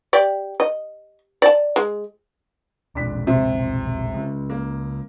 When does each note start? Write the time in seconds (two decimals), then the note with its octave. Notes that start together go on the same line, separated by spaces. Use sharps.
0.13 G4 D5
0.60 D#5
1.42 D5 A5
1.76 G#3
2.95 E1 A#1 G#3 D4 B6
3.27 C3
4.14 C#3 G#3
4.50 A#3